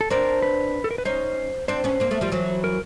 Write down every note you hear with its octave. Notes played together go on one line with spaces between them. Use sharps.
A4
C4 D4 A#4
B4
A4
A#4
B4
C#4 D#4 C5
C4 D4 C5
B3 C#4
A#3 C4
A3 B3
F3 G3
E3 F#3
A#4